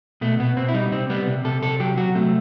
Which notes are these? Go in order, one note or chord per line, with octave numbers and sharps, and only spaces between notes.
B2 A3
B2 B3
B2 C4
E4
G3 D#4
C3 C4
G3 B3
C3
C3 A4
C3 A4
F#3 G4
F#3 F#4
C3 A3